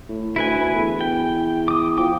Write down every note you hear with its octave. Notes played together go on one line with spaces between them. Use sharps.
A2
D2 E4 B4 G#5
E2
G5
D6 D#6
F3 G5 D6